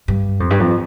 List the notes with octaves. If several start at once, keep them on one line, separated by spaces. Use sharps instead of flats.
G2
F2
G2
F2